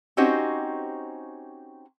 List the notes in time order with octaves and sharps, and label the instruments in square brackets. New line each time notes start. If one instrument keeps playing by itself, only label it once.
[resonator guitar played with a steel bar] C4 C#4 D#4 F#4 G4 C5